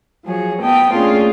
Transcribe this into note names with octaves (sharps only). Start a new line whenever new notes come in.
F3 F#3 G#4 C#5
B3 D#5 G5 A5
A3 A#3 C#4 D4 F4 G#4